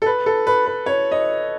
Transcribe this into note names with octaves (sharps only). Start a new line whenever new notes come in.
A4
B4
A4
B4
B4
C#5
D#5